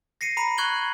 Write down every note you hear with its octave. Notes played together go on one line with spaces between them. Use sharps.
A#6 C7 C#7 D#7
A#5 B5 D#7
C#6 F#6 G#6 F#7 G7